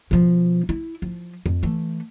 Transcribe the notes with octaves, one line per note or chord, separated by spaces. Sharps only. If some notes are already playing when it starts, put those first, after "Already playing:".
B2 F3
E4
F3
F2
E3 A3